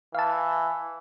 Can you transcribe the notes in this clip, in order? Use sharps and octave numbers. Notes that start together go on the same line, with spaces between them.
E3 F5 A5